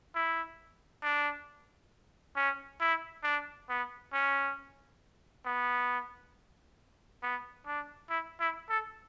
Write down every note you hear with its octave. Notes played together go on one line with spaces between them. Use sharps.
E4
D4
C#4
E4
D4
B3
C#4
B3
B3
D4
E4
E4
A4